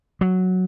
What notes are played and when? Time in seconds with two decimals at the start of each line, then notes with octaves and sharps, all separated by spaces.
0.21 F#3